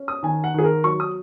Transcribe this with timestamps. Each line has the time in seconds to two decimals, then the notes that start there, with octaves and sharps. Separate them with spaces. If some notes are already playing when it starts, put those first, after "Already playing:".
Already playing: C#4
0.08 D#6
0.23 D#3 G#5
0.44 F#5
0.54 D#3 G#4
0.64 A#4
0.84 F#3 C#6
1.00 D#6